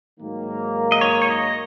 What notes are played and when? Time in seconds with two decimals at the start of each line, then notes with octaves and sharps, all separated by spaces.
0.18 G#2 D#3 F#3 A#3
0.92 D#5
1.01 C#5
1.22 C#5
1.30 D#5